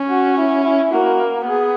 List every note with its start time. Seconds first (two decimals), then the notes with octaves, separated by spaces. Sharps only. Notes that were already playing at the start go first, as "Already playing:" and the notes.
Already playing: C#4
0.09 F#4
0.37 E4
0.64 E4
0.92 A#3 F#4
1.46 B3 G#4